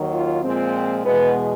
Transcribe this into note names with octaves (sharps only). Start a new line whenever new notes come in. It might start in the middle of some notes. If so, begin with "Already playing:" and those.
Already playing: D#2 D#3 F#3
F4
A#2 F3 G#3 C4
E2 B2 G#3 B3